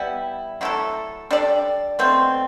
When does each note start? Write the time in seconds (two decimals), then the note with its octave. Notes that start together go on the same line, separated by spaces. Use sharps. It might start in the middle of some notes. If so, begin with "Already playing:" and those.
Already playing: G3 B3 E4
0.61 F#3 A3 E4 A4
1.31 G3 D4 A4 D5
1.99 B2 A3 C4